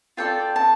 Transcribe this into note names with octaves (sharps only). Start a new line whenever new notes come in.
F4 A4 D5 G5
A5